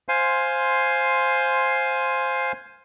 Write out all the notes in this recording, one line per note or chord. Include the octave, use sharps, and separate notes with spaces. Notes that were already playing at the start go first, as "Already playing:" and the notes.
C5 F5 G#5 C6